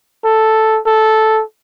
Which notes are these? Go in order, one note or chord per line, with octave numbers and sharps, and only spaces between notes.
A4
A4